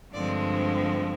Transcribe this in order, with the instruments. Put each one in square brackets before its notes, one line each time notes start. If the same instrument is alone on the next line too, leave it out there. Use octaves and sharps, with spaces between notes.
[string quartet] G2 D3 F3 G#3 C4 D5